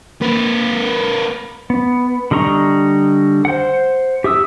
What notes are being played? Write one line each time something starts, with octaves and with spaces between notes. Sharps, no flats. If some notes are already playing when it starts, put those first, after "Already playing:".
A#3 B4
B3
D3 G3 D#5 A#5 C#6
C5 F#5
G4 E5 D#6 E6